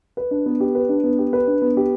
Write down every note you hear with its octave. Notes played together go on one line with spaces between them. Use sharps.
B4
D4
B3
G4
B4
D4
B3
G4
B4
D4
B3
G4